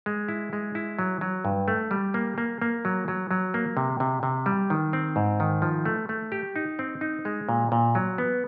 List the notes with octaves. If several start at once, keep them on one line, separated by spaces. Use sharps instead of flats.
G#3
E4
G#3
E4
F#3
F#3
G2
A3
G3
A#3
A#3
A#3
F#3
F#3
F#3
A#3
C3
C3
C3
G3
D#3
C4
G#2
D#3
F3
A3
A3
G4
D#4
C4
D#4
G#3
A#2
A#2
F#3
B3